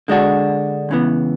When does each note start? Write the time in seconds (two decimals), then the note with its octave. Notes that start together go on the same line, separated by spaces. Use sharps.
0.08 D3 G#3 D4 F#4
0.89 C#2 C#3 E3 B3